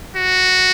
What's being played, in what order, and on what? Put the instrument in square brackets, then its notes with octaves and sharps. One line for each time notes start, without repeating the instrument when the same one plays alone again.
[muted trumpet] F#4